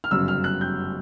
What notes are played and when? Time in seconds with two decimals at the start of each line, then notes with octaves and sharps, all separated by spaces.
0.04 F6
0.11 G1 F#2 C#3 E6
0.28 F6
0.44 F#6
0.61 G6